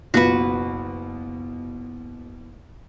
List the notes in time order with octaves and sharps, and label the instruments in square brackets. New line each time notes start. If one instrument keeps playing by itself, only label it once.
[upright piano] F#1 B2 F4 [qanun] F#4 B4